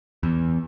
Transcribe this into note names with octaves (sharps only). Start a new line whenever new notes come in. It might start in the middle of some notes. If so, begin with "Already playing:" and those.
E2